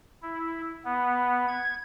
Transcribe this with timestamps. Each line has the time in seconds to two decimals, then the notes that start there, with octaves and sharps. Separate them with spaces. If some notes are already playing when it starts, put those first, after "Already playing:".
0.22 E4
0.85 B3
1.48 G#6